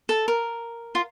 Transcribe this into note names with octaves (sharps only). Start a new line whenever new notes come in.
A4
A#4
F4